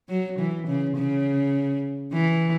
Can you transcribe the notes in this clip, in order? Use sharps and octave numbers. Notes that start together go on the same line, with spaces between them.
F#3
E3
C#3
C#3
E3